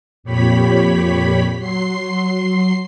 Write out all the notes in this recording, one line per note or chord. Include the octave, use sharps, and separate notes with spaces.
F2 A#2 G4 C#5 B5 B6
F#3 C6 C7